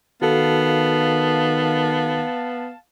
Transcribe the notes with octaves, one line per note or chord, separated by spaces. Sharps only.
D#3 B3 F#4 A4 F5 A5